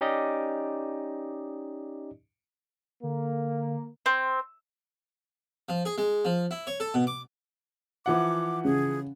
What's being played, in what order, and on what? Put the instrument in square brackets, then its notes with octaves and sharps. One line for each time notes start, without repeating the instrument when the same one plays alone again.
[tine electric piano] C#4 D#4 G4 D5 D#5
[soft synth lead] D3 [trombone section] A#3
[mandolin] C4
[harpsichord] F3
G#4
G#3
F3
E4
C#5
A4
B2
D6
[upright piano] E3 F3 F#5 [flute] D6
[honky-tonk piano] C#3 [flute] G#4